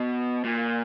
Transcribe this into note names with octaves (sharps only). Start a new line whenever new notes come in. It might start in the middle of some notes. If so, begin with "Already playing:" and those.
Already playing: B2
A#2